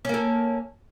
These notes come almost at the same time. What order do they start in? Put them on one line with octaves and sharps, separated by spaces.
C#4 A#3 A4